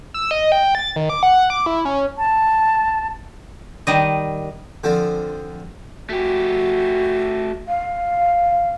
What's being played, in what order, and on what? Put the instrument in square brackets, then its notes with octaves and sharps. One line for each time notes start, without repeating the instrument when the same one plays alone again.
[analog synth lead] E6
D#5
G5
A6
D#3
D6
F#5
D6
E4
C#4
[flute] A5
[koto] D#3 G3 D#5
[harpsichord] D3 F3 C4
[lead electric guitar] A3 G4 [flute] F#4
[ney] F5